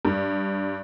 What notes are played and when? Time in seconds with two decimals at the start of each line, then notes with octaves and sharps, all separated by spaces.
0.05 G2